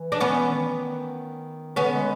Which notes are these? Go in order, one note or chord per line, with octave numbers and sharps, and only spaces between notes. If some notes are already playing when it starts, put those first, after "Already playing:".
Already playing: E3
D4
B3 C#4
D#3
D3 B3 C#4
G#3